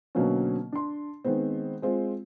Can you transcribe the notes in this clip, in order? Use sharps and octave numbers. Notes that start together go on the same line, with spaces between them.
B2 D3 F#3 A#3 C4 C#4
D4 C6
D#3 G#3 B3 C4
G#3 C4 F4